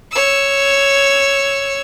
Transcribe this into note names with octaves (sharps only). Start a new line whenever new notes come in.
C#5 E6